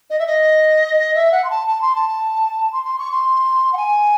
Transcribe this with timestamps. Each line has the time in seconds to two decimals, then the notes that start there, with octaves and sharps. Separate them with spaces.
0.10 D#5
0.19 E5
0.27 D#5
1.15 E5
1.32 F#5
1.44 C6
1.50 A5
1.67 A5
1.82 C6
1.95 A5
2.73 C6
2.85 C6
2.99 C#6
3.12 C6
3.73 F#5
3.77 G#5